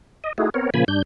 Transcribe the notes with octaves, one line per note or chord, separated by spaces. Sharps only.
D#5
A3 D#4 E4 F#4 G#4
B3 C4 A#4 C#5
A#2 C#3 F3 A#3 G#5 B5
G2 D4 G6